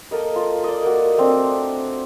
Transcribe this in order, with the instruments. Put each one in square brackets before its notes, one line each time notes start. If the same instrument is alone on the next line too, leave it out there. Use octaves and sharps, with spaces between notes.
[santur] A#3 A4 A#4 D#5
F4
D5 D#5
A#3 F#4
A3 C4 D4